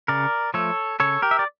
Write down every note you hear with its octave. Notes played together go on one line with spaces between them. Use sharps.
C#3 A#4 D5
F3 A3 A4 C#5
C#3 A4 C#5
G4 A#4
E5
D5